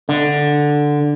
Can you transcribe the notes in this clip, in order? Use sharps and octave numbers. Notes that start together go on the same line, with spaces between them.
D3